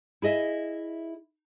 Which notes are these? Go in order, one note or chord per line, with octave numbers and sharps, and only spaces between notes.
E4 G#4 D#5 E5